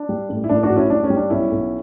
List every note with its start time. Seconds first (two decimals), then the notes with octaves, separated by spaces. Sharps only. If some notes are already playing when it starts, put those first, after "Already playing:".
Already playing: D4
0.09 G3
0.29 A1
0.44 E4
0.49 A1 D4
0.63 D4 F#4
0.70 A1
0.76 C#4 E4
0.90 G3 D4
1.04 C#4
1.10 G3
1.17 D4
1.30 B1 C#4 E4
1.51 B1